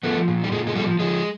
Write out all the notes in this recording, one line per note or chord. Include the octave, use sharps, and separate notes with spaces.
F3 A3 B3
A#2
G3
A#2 G#3
G#3
F3 G3 A3
F3 G#3